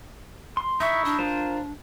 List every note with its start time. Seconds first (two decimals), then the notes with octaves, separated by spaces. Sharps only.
0.57 C6
0.80 D#4 E4 E5 C#6
1.05 D4
1.19 F4 A#4 C5